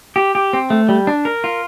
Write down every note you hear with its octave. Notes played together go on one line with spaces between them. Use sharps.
G4
G4
C4
A3
G3
D4
A#4
F4